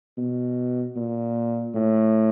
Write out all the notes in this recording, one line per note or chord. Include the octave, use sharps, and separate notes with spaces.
B2
A#2
A2